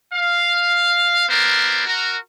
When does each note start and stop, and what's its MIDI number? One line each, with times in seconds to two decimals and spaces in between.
0.13 1.27 77
1.29 1.86 59
1.29 1.86 64
1.29 1.86 70
1.29 1.86 72
1.29 1.86 74
1.86 2.16 66
1.86 2.16 70